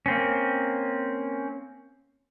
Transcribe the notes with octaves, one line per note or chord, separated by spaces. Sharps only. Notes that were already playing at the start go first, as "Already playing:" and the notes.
A#3 C4 C#4